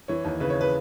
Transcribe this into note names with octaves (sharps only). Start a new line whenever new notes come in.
E3 C#5
D#2
C#3 B4
C#5
B4